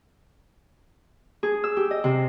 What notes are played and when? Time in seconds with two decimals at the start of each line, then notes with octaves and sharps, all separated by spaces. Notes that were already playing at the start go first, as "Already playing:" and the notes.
1.43 G#4
1.64 E6
1.77 G4
1.91 D#5
2.04 C3